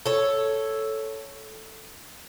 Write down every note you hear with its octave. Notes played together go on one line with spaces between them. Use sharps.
A4 C#5